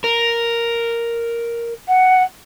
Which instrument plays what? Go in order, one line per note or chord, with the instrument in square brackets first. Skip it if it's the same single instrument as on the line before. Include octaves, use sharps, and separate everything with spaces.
[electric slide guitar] A#4
[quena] F#5